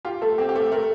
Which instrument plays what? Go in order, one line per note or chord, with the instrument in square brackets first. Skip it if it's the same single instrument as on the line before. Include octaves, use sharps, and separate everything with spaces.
[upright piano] F4 [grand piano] G4
[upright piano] A3 [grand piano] A4
[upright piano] C4 [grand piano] G4
[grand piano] G4
[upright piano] A3
[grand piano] G4
[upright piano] A3 [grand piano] A#4